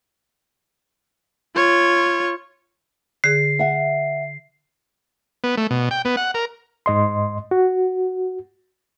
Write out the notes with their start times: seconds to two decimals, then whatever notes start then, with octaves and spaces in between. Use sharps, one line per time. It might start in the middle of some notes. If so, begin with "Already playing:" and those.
1.56 F4 C#5
3.24 D3 G#4 C7
3.59 E5 F#5
5.44 B3
5.57 A3
5.71 B2
5.91 G5
6.05 B3
6.17 F#5
6.34 A#4
6.86 G#2 D#5 C6
7.51 F#4